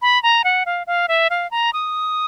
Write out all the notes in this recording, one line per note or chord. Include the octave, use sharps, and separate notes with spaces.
B5
A#5
F#5
F5
F5
E5
F5
A#5
D#6